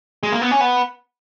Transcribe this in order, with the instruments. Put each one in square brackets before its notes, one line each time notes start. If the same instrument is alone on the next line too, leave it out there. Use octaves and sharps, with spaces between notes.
[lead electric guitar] G#3
A#3
B3
C#4
B3